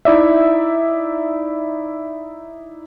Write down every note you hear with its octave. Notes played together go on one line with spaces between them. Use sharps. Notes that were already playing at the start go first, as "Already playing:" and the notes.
D#4 E4 D5 E5